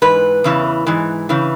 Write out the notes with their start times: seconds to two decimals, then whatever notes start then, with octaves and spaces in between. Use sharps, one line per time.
0.02 G#2 E3 B4
0.44 E2 C#3 E3
0.87 G#2 E3
1.29 C#3 E3